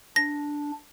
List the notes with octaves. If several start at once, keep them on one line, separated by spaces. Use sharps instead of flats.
D4 A#6